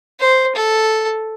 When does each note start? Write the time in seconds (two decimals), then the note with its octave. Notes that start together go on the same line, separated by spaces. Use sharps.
0.19 C5
0.56 A4